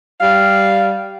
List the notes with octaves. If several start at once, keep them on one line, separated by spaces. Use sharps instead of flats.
G3 F5